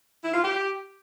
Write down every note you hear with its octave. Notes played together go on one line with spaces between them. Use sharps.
E4
F4
G4